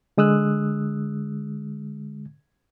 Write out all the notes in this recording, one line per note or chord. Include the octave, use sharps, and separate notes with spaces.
D3 G#3 D#6 E6 F#6